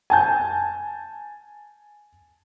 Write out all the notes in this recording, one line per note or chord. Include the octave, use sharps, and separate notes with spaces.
G#5 A5 G6